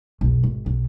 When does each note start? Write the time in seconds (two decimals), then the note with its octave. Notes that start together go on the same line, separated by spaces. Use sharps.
0.21 B1 F2
0.43 G#1
0.66 B1